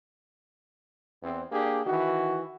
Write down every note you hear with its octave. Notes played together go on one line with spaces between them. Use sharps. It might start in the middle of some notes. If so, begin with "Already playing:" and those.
E2 C4
A#3 D4 G4 G#4
D#3 E3 F#4